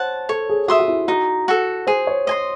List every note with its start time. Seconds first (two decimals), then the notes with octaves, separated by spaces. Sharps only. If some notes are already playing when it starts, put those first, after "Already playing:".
Already playing: C5 C#5 F#5 A5
0.29 A4 C#5
0.49 G#4
0.68 F#4 E5 C6 D#6
0.80 F#4
0.88 E4
1.08 D#4 F#4
1.48 F#4 A4
1.87 G#4 C5
2.07 C#5
2.27 C5 D#5 G#5 C6